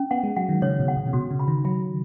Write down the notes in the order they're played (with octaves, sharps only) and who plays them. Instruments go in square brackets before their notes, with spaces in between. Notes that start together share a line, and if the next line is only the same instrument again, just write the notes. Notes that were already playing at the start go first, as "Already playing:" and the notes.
Already playing: [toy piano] C#4
[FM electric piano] B3 [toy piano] F#5
[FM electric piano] G#3
[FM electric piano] F#3 [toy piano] F#5
[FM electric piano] D#3
[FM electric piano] C#3 [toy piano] C#5
[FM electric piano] B2
[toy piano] F#5
[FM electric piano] B2
C#3
[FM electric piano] B2 [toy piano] F#4
[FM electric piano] C#3
[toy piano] B5
[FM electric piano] D#3
[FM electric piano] F#3 [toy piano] B5